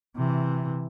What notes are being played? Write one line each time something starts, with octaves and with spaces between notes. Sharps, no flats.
C3 E3